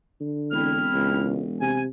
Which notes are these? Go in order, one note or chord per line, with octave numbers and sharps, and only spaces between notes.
D3
E1 C4 E4 F6
C#2
C3 G#5